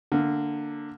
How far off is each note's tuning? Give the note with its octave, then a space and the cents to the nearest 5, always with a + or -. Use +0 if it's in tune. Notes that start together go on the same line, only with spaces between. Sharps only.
D3 +0 A#3 -20